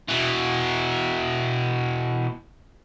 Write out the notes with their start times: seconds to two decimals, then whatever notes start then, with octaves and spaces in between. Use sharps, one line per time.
0.09 B2 E3